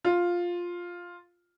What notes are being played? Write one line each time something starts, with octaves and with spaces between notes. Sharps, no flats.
F4